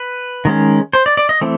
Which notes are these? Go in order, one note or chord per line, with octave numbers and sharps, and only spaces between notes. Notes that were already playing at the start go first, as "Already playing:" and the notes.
Already playing: B4
D#3 G#3 C#4
C5
D5
D5
D#5
E3 A3 C4